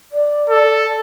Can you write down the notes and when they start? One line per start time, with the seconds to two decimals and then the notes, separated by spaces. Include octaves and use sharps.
0.12 D5
0.50 A4